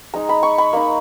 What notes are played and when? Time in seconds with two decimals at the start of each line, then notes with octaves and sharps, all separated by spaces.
0.14 G#3 D#4 A#5
0.29 B5
0.43 C#6
0.58 B5
0.73 A#3 D#4